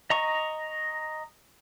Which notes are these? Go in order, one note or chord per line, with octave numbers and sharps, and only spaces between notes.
D#5 A#5 C#6